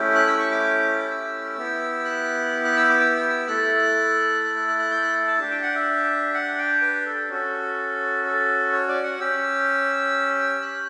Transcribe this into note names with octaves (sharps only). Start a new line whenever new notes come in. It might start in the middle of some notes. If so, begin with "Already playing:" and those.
Already playing: A3 C#4 E4 G4
F#6
E6
C#6
D6
E6
B3 E4 G4
F#6
F#6
E6
D6
E6
A3 E4 A4 F#6
F#6
F#6
F#6
F#6
G6
F#6
A5
D4 G4 A5
G5
F#5
E5
F#5
G5
B4
A4
C#4 F#4 A4
A4
C#5
D5
F#5
C#4 G4 E6
F#6